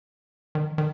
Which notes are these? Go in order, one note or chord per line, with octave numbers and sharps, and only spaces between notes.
D#3
D#3